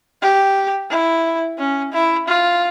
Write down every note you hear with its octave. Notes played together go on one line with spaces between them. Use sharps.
G4
E4
C#4
E4
F4